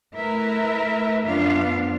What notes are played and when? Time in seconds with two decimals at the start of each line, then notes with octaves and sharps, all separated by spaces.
0.15 A3 E4 A#4 B4 E5
1.24 F#2 F3 B3 D4 F4 F5